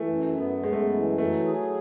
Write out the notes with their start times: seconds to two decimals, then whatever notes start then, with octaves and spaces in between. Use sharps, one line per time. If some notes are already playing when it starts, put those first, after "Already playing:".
Already playing: E3 A3
0.09 F#2
0.37 B3
0.63 F#2 G#3
0.72 A3
0.79 G#3
0.92 E3
1.18 F#3 A3
1.46 G#4